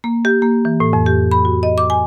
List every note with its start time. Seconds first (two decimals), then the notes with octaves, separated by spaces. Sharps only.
0.04 A#3
0.25 G4
0.42 A#3
0.65 E3
0.80 A2
0.93 F2
1.06 G4
1.32 B5
1.45 F#4
1.63 D#5
1.78 D6
1.90 G#5